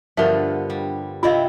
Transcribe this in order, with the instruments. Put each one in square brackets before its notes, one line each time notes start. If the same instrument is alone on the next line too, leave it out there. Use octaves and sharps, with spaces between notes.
[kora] G2 F3 [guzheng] D3 B3 [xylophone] A#4 E5
[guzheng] G3
[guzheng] C3 C4 E4 [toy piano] F4 D#5 F5